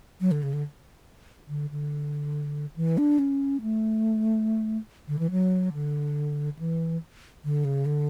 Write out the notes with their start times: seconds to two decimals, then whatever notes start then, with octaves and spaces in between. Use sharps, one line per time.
0.21 F#3
0.31 D3
0.43 C#3
0.53 D3
1.48 D3
1.71 D3
2.76 E3
2.98 D4
3.19 C#4
3.62 A3
5.08 D3
5.19 E3
5.31 F#3
5.73 D3
6.59 E3
7.44 D3
7.65 C#3
7.86 D3